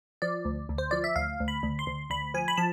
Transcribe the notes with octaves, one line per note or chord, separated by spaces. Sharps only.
F3 D5
D2
D2
C5
F3 D5
E5
D2 F5
D2
B5
D2
C6
D2
D2 B5
F3 G#5
B5
F3 A5